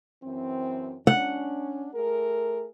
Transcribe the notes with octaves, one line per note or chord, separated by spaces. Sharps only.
F#2 E3 C4
C#4 D4 F#5
A3 G#4 A#4